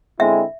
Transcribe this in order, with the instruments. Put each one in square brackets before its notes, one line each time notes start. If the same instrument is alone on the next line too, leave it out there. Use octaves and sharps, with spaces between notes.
[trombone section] D3 G#3 C4 E4 [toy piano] E5